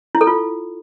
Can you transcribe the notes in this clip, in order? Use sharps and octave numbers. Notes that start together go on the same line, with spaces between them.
E4
A4
F4